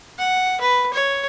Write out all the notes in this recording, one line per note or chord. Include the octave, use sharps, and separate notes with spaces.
F#5
B4
C#5